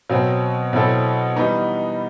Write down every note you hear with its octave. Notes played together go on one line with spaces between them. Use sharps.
B2 F#3 C4
B2 F#3 C4 E4 A4
E3 G3 B3 D#4